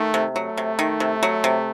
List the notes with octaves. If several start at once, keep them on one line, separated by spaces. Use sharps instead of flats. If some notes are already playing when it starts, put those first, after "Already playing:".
Already playing: D#3 A3
C3
F#3 A3
C3
D#3
C3
F#3
C3